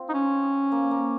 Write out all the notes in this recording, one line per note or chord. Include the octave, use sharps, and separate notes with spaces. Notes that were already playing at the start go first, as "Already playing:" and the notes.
Already playing: C4 F4
D#4
C#4
A#3
A#3